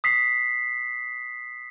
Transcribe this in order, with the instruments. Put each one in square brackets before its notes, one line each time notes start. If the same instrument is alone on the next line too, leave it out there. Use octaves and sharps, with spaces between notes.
[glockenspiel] D#6 B6 C7